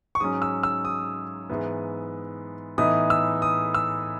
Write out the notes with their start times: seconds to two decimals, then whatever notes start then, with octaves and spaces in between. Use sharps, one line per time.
0.15 C#6
0.20 G#2 F#3 C#4 D#6
0.42 E6
0.63 E6
0.85 D#6
1.49 G#2 E3 B3
2.78 A2 E3 B3 D#4 D#6
3.10 E6
3.42 D#6
3.74 E6